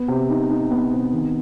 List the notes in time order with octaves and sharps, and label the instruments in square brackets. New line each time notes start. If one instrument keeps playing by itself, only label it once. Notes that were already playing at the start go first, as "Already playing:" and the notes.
Already playing: [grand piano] B3
C3
D#4
D#4
B3
C3
D#3